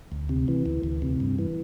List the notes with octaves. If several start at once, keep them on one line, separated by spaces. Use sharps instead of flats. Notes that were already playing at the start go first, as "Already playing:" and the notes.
D2
C3
E3
D2
D2
C3
G2
E3